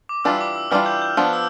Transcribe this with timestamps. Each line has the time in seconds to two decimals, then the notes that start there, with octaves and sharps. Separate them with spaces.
0.09 D6
0.24 E3 G3 D4 F4 E6
0.41 D6
0.55 E6
0.71 E3 G3 D4 F4 F6
0.86 G6
1.02 G6
1.17 F3 B3 D4 F6
1.33 E6